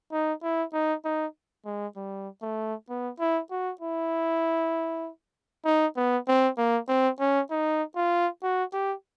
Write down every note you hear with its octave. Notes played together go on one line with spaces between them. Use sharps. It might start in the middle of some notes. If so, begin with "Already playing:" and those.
D#4
E4
D#4
D#4
G#3
G3
A3
B3
E4
F#4
E4
D#4
B3
C4
A#3
C4
C#4
D#4
F4
F#4
G4